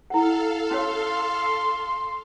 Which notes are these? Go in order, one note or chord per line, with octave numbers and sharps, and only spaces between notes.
E4 A4 F5 F#5
C#4 F#4 C#5 C6